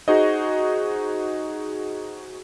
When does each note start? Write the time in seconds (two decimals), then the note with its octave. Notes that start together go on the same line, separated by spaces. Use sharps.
0.08 D#4 F#4 G#4 C5 D#5